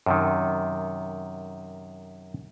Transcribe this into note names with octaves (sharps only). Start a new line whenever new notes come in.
F#2 C3 D#3